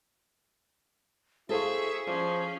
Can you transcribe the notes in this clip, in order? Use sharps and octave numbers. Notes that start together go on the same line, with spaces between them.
E4 G#4 A4 C5 E5 F5 C#6
F3 C#4 D5